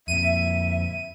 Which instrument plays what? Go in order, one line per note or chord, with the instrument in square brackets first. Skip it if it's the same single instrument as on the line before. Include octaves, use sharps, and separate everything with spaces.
[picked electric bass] F2 A#2 [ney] E5 [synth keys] D#7